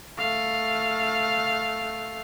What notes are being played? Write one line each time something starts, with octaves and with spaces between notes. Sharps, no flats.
A3 F5